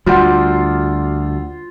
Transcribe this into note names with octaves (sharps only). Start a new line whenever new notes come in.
D2 G3 F4 F#4 C5 F#5